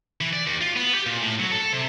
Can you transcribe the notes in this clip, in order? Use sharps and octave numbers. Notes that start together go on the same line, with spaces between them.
E3
D5
D#2
F4
B3
G4
A#2
A2
F#3
A4
C3